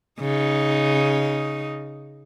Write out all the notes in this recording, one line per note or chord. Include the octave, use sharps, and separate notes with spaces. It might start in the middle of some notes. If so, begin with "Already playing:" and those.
C#3 D#4